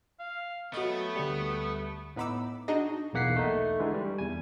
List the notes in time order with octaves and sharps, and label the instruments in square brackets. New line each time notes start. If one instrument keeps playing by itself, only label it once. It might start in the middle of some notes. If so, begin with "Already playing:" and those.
[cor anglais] F5
[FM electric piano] F#3 D#5 [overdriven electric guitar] A3 [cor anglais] B3
[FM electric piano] D2 G3
[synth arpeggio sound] A2 B3 D#4 B5 D6 E6
D4 D#4 F#4 G#4 D#5
[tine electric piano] B1 E2 A#3 F#5 B6 C7
A3 D#4
D3 E3 G#3
G3
E2 G#5